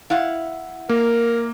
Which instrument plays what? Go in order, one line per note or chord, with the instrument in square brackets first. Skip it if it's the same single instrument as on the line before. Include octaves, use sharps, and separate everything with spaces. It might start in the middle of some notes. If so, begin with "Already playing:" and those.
[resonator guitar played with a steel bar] E4 F5 F#5
[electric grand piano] A#3 [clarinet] A#4